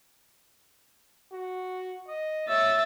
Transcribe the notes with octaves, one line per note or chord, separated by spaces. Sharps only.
F#4
D#5
C#5 E5 E6 A6